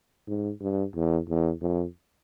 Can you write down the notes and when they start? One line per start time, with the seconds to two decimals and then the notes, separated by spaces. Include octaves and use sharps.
0.27 G#2
0.61 G2
0.95 E2
1.29 E2
1.61 F2